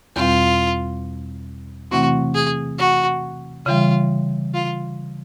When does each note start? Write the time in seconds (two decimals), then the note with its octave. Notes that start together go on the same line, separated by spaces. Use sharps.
0.16 E2 B2 G3 C4 F4
1.91 C3 E3 A3 C4 E4 F#4
2.35 G#4
2.79 F#4
3.66 C#3 E3 G3 F4
4.54 F4